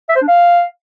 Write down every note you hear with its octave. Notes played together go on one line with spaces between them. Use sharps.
E5
C5
D4
F5